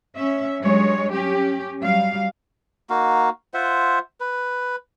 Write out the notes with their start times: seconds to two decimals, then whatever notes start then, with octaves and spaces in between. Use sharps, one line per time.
0.15 C#4 E5
0.60 G2 F#3 G#3 C#5
1.11 C#4 G4
1.80 F#3 G3 F5
2.90 A#3 D#4 F#4 F5
3.54 F4 C5 E5 F#5
4.20 B4